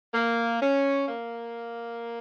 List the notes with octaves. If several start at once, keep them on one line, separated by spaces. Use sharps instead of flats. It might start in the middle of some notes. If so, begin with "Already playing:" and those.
A#3
C#4
A#3